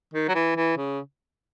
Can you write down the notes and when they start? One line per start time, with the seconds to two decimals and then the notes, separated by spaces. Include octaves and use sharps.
0.14 D#3
0.28 F#3
0.35 E3
0.56 E3
0.77 C#3